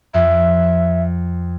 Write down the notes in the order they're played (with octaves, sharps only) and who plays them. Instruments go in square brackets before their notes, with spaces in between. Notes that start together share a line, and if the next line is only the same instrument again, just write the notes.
[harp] F2 [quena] E5